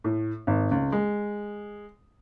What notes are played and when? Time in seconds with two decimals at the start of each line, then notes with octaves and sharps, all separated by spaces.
0.04 A2
0.47 G#1
0.71 C#2
0.92 G#3